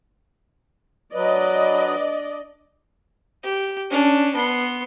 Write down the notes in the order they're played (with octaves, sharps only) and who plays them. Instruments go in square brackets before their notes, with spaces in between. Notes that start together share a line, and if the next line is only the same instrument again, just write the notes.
[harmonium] F#3 B4 [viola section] D4 D5 D#5
[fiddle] G4
C#4 D4
B3 C6